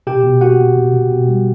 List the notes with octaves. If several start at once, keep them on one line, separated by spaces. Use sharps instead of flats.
B2 G4 G5
B2
A#3 F#4 F#5
B2
B2
B2
B2
G3